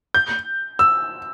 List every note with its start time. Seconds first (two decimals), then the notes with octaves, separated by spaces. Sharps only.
0.14 G6
0.79 E6